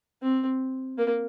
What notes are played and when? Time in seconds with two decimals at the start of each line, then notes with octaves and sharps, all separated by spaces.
0.22 C4
0.98 A#3